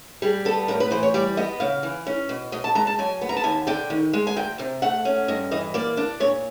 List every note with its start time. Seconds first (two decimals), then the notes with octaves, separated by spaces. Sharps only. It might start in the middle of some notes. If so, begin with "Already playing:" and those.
0.22 G3 G#4
0.45 B3 A4
0.68 A2 A#4
0.80 B4
0.91 E3 C5
1.03 C#5
1.14 G3 D5
1.37 B3 D#5
1.60 C#3 F5
1.83 E3
2.07 C#4
2.29 B2
2.52 B2 D#5
2.64 A5
2.75 G#3 A#5
2.87 A5
2.99 F#3 G#5
3.22 B3
3.29 A#5
3.36 A5
3.44 D#2 G#5
3.67 D3 G5
3.90 D#3
4.13 G#3
4.27 G#5
4.36 D2 G5
4.59 C3
4.82 A3 F#5
5.05 C#4
5.28 G2 D#5
5.51 E3 D#5
5.74 A#3 D5
5.97 D4
6.20 A#2 C#5